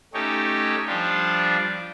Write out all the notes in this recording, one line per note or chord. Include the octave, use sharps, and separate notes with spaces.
A3 C#4 D#4 G4 C#5
F3 G3 D4 F4